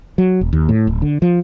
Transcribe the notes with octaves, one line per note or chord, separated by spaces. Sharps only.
F#3
E1
D#2
A2
D1
D3
F3